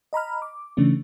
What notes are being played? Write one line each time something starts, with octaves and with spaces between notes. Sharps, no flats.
D#5 A#5 B5 F6
D6
C#3 E3 A3 C#4 D4